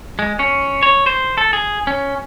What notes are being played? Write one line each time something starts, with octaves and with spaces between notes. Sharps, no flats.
G#3
C#4
C#5
C5
A4
G#4
C#4